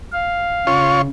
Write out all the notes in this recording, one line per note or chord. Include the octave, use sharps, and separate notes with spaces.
F5
C#3 F4 C#5